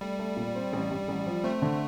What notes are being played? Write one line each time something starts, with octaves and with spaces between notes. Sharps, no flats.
G3 A3
A3
A#2
C4
A1
G2
A1
F3
A3 C4
D3